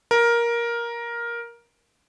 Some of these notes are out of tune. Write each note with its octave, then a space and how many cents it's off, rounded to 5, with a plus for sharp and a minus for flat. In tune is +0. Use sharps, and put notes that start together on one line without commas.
A#4 +10